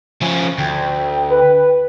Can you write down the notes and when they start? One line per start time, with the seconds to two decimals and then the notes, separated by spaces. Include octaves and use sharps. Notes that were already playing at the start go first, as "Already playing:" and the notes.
0.22 F3 C#4
0.58 D2 G5
1.30 B4